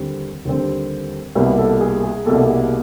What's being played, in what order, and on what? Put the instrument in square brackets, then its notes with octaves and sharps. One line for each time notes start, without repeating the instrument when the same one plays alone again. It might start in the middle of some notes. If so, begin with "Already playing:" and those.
Already playing: [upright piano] D#2 D3 G3 C4
D#2 D3 G3 C4
C2 B2 G3 A#3 B4
A4
G#4
G#4
C2 B2 G3 A#3 A4
G#4